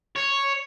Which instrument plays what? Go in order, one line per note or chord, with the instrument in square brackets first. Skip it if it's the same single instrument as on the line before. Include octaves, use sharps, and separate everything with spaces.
[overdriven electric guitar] C#5